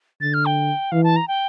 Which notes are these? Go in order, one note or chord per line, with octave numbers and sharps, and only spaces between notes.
D3 A6
F6
G5
E3 F5
A5
A#5
G5